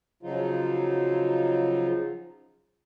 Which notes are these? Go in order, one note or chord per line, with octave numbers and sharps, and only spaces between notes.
C#3 F3 F#3 D#4 F4